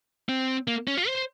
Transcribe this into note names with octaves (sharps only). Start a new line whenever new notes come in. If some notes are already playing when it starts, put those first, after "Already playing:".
C4
A#3
C#4
F4
C5